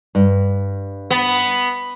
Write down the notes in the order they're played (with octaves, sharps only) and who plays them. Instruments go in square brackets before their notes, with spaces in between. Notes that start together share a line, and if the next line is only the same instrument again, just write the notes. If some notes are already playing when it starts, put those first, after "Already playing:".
[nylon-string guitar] G2
[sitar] B3